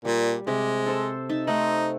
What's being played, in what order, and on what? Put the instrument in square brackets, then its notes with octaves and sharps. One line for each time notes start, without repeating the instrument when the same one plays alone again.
[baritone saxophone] A#2 [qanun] G3
[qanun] C3 G4 [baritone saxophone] G#3
[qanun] A4 C5 A5
D#4 E5 A5
[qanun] A3 C4 F#5 [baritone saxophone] D#4